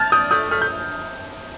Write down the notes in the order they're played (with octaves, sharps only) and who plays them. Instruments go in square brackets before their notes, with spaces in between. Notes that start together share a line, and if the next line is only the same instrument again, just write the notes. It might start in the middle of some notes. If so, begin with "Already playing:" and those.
Already playing: [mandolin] A5 [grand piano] F6 G6 A6
[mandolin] D5 [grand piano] D#6 G6
[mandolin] A3 [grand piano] D#6 G6
[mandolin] A3 [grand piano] F6
[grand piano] G6